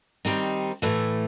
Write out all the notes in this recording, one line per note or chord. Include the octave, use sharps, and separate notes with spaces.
D#3 G3 C4 D#4
A2 E3 A3